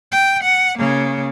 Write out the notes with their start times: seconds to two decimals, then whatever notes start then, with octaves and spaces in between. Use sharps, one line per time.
0.12 G5
0.43 F#5
0.78 C#3 A#3